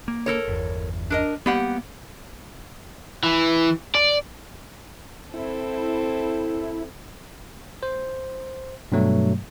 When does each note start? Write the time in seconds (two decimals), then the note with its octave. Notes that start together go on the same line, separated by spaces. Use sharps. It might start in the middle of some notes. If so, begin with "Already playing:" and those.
0.08 A#3
0.26 A4 A#4 C#5
0.48 G1 E2
1.10 D4 A#4 D#5
1.46 G3 A#3 B3 G4 F#5
3.23 E3
3.95 D5
5.34 C4 E4 A4
7.83 C5
8.92 G2 B2 F#3 A3